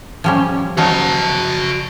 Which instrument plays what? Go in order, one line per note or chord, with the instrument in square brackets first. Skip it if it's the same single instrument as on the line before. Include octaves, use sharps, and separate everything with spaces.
[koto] F3 G3 C#4
[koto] F3 F#3 D#4 [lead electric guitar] F#4 A5